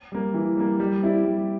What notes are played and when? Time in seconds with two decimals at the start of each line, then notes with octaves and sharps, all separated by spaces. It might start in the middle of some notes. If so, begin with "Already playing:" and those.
0.12 G3 A#3
0.34 E3
0.57 G3 A#3
0.80 G3
1.02 C4 E4 G4 D5
1.25 G3